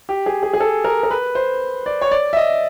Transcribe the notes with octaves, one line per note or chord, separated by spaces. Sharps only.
G4
G#4
G#4
G#4
A4
A#4
A#4
B4
C5
D5
C#5
D5
E5
D#5